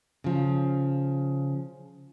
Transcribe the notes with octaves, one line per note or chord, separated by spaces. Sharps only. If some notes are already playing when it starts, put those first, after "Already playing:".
C#3 F3